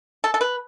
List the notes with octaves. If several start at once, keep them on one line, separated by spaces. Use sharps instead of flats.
A4
A4
B4